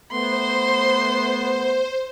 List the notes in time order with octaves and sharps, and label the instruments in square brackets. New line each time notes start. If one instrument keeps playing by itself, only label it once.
[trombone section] A3 B3 [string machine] C5 [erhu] C6